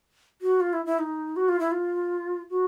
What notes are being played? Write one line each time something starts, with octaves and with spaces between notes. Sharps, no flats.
F#4
F4
E4
E4
D#4
F#4
F4
E4
F4
F#4